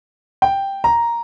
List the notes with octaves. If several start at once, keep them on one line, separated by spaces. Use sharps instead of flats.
G5
A#5